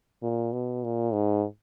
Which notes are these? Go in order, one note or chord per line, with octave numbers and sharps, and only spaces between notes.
A#2
B2
A#2
G#2